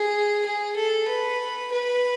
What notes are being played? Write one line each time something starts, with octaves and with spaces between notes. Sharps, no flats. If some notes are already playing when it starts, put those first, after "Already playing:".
Already playing: G#4
G#4
A4
B4
B4